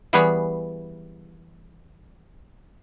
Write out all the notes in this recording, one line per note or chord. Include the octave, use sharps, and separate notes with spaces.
E3 G3 B3 G#4 B4 C#5